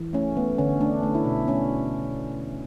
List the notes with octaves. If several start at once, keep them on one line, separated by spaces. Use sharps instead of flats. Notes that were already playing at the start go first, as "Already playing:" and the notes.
Already playing: E3
A3 C#4
A3 B3
D3 C#4
A3 D4
A3
E4
B2
A3 C#4